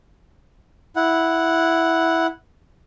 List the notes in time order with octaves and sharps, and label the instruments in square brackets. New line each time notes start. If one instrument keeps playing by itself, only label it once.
[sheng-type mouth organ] E4 F#5